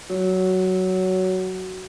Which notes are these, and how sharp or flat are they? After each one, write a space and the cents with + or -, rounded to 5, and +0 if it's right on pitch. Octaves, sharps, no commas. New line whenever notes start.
F#3 +10